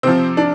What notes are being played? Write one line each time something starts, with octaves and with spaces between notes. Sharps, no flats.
C3 F3 C4
D4